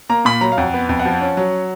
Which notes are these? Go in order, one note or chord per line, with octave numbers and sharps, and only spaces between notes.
A#3 A#5
A#2 B5
F#3 A#5
F5
F2 F#5
B3
F2
F#5
F3
C#4
F#3